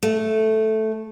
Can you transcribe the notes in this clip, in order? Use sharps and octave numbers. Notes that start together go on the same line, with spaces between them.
A3